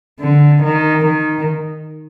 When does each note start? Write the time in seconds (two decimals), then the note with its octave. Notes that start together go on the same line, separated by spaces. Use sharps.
0.20 D3
0.63 D#3
1.05 D#3